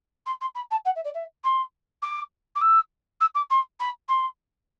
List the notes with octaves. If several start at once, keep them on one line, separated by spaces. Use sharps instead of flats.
C6
C6
B5
A5
F#5
E5
D5
E5
C6
D6
D6
E6
E6
D6
C6
B5
C6